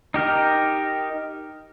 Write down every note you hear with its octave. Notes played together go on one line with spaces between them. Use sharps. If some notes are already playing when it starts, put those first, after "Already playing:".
D#4 G4 A#4